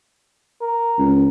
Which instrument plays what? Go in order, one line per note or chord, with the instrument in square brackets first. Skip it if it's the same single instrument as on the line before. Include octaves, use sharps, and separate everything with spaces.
[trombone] A#4
[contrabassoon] C#2